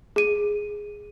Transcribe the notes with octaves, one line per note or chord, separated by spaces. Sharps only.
G#4 D#7